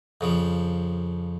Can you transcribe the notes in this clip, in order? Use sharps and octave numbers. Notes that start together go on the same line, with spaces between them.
F2 C#3 F3